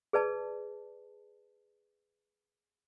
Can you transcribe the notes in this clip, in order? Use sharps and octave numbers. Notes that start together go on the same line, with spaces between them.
G#4 B4 D5 A5